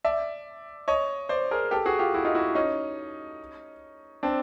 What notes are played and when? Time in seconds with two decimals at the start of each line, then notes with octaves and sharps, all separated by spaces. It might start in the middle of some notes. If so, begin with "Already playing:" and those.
0.05 D5 E5
0.88 C#5 D#5
1.29 C5 D5
1.51 G#4 A#4
1.71 G4 A4
1.86 F#4 G#4
1.99 F4 G4
2.14 E4 F#4
2.25 D#4 F4
2.35 E4 F#4
2.55 C#4 D#4
4.23 C4 D4